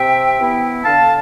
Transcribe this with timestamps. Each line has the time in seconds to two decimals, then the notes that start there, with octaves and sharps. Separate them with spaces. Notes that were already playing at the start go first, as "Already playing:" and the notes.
Already playing: C3 E5 G5
0.38 E3 B3 E4
0.84 D3 F5 A5